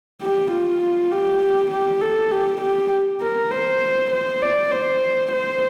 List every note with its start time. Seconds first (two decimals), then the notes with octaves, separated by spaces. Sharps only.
0.22 G4
0.52 F4
1.11 G4
1.71 G4
2.01 A4
2.31 G4
2.62 G4
3.21 A#4
3.52 C5
4.11 C5
4.42 D5
4.71 C5
5.32 C5